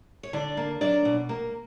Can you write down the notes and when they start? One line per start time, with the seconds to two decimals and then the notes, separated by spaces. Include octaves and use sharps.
0.23 C#5
0.33 D3 D4 D5
0.57 A#3
0.81 F#3 D4 D5
1.05 B2
1.29 A#3